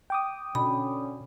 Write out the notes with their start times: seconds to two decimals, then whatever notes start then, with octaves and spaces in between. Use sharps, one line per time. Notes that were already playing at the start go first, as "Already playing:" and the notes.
0.10 G5 D6 D#6
0.55 B2 D3 C#4 B5